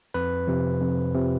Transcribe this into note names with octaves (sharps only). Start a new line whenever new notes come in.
F2 B4
C3 F3
F2
C3 F3